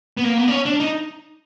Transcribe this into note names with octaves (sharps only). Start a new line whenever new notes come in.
B3
A#3
B3
D4
C#4
D4
D#4